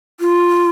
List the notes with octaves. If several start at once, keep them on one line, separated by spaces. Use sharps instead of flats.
F4